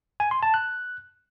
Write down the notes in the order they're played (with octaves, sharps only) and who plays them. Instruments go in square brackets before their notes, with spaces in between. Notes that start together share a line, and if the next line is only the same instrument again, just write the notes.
[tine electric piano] G#5
C6
A5
F#6